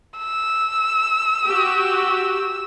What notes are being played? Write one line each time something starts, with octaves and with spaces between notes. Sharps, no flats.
E6
F#4 G4